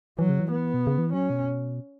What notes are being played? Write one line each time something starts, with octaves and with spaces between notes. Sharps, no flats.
E3 F#3
C#3
E3
B3
B2
C#3
E3
F#3 C#4
B2